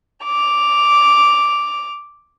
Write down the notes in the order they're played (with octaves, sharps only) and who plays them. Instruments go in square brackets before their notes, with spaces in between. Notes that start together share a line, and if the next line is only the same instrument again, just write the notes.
[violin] D6 F7